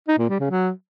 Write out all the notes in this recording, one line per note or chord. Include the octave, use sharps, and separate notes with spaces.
D#4
A#2
G3
C#3
F#3